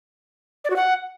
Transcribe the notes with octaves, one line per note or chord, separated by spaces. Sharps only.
D5
F#4
F#5